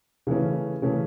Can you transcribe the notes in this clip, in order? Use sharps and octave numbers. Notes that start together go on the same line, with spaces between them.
C#3 E3 A3 C#4
C#3 E3 A3 C#4